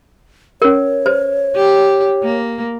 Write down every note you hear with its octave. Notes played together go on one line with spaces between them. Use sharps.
C#4 A#4 C#5
B4 C5
G4
A#3